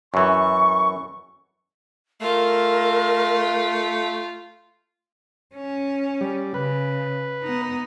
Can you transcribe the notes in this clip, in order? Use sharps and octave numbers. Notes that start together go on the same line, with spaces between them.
F#2 E3 C#6
A3 F4 A#4
C#4
G3
C#3 B4
B3 D#4